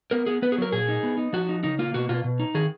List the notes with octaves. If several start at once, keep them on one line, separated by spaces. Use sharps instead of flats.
B3 A#4
B3 G#4
B3 B4
G#4
F#3 A#4
A#2 G#4
D#4
B3
D#4
F3 F#4
D#4
C#3 D#4
A#3 F4
B2 F#4
B2 F4
B2
D#4
D#3 G#4